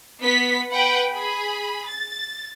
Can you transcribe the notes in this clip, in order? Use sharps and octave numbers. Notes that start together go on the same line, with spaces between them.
B3 B6
B4 F#5 G5 B5
G#4 B5
A6